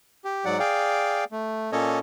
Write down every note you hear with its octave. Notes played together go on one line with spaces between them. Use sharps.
G4
G#2 F#3 D5 F#5
G#4 D5 F5 G5
A3
A#2 A#3 C#4 A4 C#5 D#5